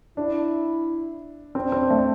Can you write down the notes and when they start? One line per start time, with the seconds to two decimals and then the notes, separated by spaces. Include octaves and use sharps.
0.17 D4 E4
1.55 C4 D4
1.72 C4
1.90 A3